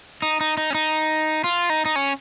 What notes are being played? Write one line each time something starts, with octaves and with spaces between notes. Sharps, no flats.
D#4
D#4
D#4
C#4
D#4
F4
D#4
D#4
C#4